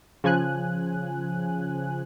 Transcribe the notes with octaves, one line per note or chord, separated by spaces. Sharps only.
C#3 F3 G#5 F#6